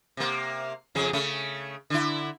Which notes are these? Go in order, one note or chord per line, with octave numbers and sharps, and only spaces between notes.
C3 A#3
F2 C#3 G#4
C#3 A3
D3 E4